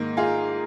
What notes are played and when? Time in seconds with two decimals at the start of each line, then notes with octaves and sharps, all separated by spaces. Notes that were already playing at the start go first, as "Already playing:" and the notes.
Already playing: G#2 D#3 A#3
0.17 F4 G#4